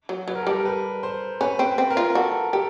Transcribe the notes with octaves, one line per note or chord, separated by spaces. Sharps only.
F#3
F#3 B4
A#4
A4
G3 A#4
B4
C5
C#4 B4
C4
B4
C4
A#4
F4
F#4 A4
G4 A4